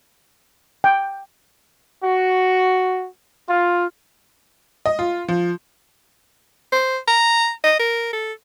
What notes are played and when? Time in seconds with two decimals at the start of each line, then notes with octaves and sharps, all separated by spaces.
0.84 G5
2.04 F#4
3.48 F4
4.86 D#5
4.99 F4
5.28 F3
6.72 C5
7.08 A#5
7.64 D#5
7.79 A#4
8.13 A4